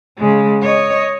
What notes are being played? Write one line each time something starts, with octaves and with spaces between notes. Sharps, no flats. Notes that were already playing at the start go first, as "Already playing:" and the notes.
C#3 G#3
C#5 D#5